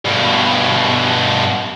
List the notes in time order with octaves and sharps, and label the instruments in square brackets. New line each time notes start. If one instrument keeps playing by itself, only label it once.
[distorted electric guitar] G2 B2